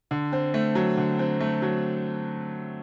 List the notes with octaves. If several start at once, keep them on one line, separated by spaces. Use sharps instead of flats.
D3
C4
A3
F#3
D3
C4
A3
F#3